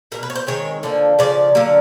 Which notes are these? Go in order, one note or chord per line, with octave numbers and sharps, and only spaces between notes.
B2 G3 A#3 A#4
B4
C#5
C5
D#3 G#3 C4 C#5
D3 F3 A#3
C#3 F3 D5
D3 F#3 A#3